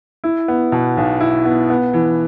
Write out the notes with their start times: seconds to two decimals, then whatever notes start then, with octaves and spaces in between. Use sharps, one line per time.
0.24 E4
0.48 B3
0.72 B2
0.97 B1
1.20 E4
1.45 B3
1.70 B3
1.93 E3